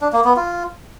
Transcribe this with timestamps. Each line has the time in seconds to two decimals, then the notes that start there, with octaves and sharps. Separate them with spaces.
0.01 D4
0.13 A#3
0.25 B3
0.36 F4